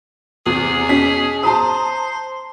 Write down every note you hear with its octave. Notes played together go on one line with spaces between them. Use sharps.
E2 C3 G#4
B2 C#4 B6
C5 A5 A#5 D#6